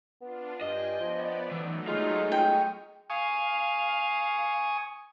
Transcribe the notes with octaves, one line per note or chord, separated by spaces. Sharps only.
B3 D4 F4
G2 D#5 G5 G#5
F3 B3 D5
A2 E3 F#3 A3 D#4
G#3 F4
G5 C#6 D#6 F6
F5 G#5 C#6 D#6